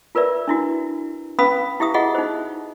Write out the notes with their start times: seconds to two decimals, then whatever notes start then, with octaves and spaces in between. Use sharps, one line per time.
0.15 F4 A#4 B4 D5 E5
0.48 D4 E4 F#4
1.39 C#4 B4 F5 B5 D#6
1.80 E4 G4 E5 D#6
1.94 F4 F#4 G#4 D#5 F#5
2.15 D#4 C5